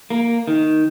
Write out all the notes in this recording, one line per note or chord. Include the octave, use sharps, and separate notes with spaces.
A#3
D#3